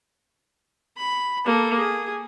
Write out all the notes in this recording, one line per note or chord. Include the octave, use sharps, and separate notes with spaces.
B5
A#3 A4
G#4